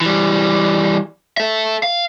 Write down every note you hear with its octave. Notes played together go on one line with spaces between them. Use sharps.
E3 G3
A4 E5
F5